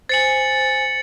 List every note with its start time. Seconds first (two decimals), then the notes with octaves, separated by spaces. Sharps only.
0.09 C5 G#5 A6 C#7 F#7